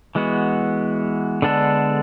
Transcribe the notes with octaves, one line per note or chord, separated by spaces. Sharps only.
E3 G#3 B3 F#4
D3 G#3 B3 D4 A4